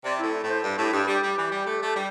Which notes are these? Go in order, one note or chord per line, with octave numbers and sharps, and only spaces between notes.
C3 D5
A2 E4
A2 C5
G2
A2 G4
G2 G4
G3 G4
G3
E3
G3
A3
A3
G3